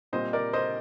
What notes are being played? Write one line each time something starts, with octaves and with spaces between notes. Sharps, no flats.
A#2 G3 C4 C5 D#5
A#4 D5
C5 D#5